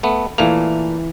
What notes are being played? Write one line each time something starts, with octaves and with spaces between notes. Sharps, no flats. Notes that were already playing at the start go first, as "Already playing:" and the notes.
A3 B3
A#2 E3 A3 A#3 F7